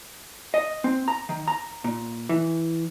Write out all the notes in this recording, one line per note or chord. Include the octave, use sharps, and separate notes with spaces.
D#5
C4
A#5
D#3
A#5
A#2
E3